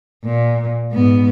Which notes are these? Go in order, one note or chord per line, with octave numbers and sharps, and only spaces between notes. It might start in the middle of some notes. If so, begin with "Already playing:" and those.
A#2
G#2 B3